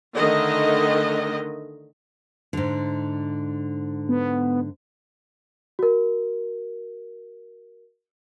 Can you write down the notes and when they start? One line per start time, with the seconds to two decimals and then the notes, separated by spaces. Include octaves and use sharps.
0.15 D3 D#3 A3 D#5
2.53 G#2 D3
4.09 B3
5.79 F#4 A#4